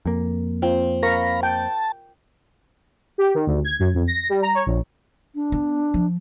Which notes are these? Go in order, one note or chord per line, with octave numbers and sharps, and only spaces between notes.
F2 A#3
C4 F4
A#4 F5 B5 C#6 A#6
G5 A5
G4
D#3
D2
G#6
F#2
F2
A#6
G3
A#5
C#5
A#1
D4
B3
F3